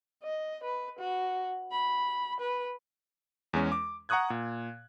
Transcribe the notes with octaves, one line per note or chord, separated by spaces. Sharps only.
D#5
B4
F#4
B5
B4
E2 G#3 C#4
D6
F#5 A#5 C#6 D#6 F#6 G#6
A#2